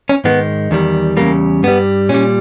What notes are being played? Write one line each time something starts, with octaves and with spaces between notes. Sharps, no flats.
C#4
G#2 D#3 G#3 B3
E2 D#3 G3
E2 C#3 G3 A#3
G2 G3 B3
A#2 G3 C#4